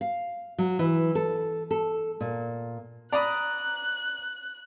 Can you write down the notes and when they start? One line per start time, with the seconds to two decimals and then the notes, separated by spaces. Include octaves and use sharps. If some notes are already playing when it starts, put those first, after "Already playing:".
0.01 F5
0.58 F#3
0.79 E3
1.15 A4
1.71 A4
2.20 A#2
3.13 D5 A#5 B5 D#6 F#6